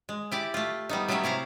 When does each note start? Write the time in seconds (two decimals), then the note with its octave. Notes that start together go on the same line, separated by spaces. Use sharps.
0.09 G#3
0.32 E4 G4 D5
0.54 A3 F4
0.89 G3 B3 D#4
1.08 F#3 A3 C#4 G4 C#5 E5
1.24 C3 E4 F5 A#5